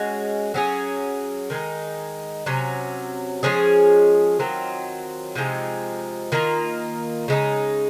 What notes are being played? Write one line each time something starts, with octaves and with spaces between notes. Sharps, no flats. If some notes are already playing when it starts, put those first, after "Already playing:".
Already playing: G#3 C#4 F#4
F#3 C#4 G#4
D#3 G#3 D#4
C3 F#3 C#4
F3 G#3 C#4 G#4
D#3 F#3 C4 F4
C3 F3 G#3 D#4
D#3 A#3 F4
C#3 G#3 D#4